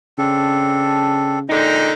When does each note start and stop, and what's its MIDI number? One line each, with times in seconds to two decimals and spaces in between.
0.18 1.47 49
0.18 1.39 60
0.18 1.39 62
0.18 1.39 69
1.49 1.92 46
1.49 1.92 50
1.49 1.89 56
1.49 1.92 63
1.49 1.89 79